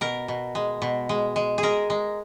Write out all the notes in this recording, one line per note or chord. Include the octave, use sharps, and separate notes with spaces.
B2 A#4
B2
G#3
B2
G#3
G#3
G#4
G#3 A#4
G#3